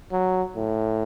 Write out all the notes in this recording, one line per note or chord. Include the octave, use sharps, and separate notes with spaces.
F#3
A2